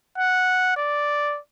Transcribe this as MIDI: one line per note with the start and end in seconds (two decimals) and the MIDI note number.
0.18 0.74 78
0.77 1.39 74